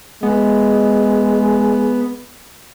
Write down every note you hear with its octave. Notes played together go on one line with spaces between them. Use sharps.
G#3 B3